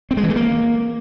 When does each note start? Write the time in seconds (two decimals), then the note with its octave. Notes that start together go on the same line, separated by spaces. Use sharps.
0.11 C4
0.17 G#3
0.23 E3
0.30 A3
0.36 A#3